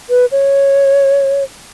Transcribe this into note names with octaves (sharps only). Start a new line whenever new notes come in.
B4
C#5